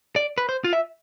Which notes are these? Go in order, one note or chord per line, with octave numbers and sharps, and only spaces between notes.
D5
B4
C5
F4
E5